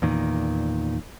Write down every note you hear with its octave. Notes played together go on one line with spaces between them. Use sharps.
E2 A#2 D#3